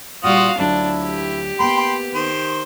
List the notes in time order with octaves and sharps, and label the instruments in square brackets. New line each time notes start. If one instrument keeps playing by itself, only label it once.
[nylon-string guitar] A#2 G3 [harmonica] F4 D#6 [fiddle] F#4 F5
[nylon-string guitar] D2 F#3 F4 [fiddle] D4 [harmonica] E4
[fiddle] G4
[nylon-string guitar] A#3 B3 [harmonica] G5 B5 C6
[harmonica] D#3 C5